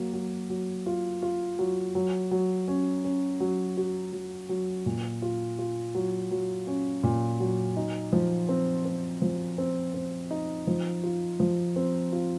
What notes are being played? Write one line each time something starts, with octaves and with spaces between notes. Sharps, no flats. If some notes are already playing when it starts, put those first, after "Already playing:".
Already playing: F#3 A#3
F#3
F#3
F4
F4
F#3
F#3
F#3
C#4
C#4
F#3
F#4
F#3
F#3
A#2
F4
F4
F#3
F#3
C#4
A#2
F#3
D#4
F3
C4
C4
F3
C4
C4
D#4
F3
F4
F3
C4
F4